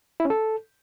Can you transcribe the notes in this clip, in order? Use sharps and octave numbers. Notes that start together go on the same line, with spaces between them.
E4
C#4
A4